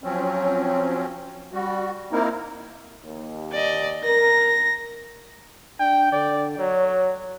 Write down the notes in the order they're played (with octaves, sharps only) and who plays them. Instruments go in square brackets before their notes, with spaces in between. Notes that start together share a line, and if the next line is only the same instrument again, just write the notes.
[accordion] F3 F#3 C4 C#4
G3 F#4
A#3 C4 D#4 E4 A#4
[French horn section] D#2
[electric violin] D5 D#5
[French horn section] A#4 [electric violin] A#6
[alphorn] D4 [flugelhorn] G5
[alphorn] D3 [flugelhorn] D5
[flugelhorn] F#3 [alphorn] C#5